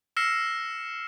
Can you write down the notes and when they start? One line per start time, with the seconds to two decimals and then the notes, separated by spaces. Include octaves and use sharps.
0.17 E6 F6 A#6 C7 C#7 E7